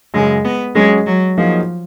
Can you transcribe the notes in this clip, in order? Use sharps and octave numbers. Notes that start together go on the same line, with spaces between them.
F#2 C#3 F#3 G#3
B3
F#3 G#3 C#4 G#4
F#3
F3 F#3 A#3 D#4 G#4